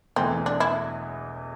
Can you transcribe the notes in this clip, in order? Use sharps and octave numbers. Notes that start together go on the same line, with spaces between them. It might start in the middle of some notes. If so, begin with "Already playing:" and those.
E1 E2 E3 A3 C4
D4
E4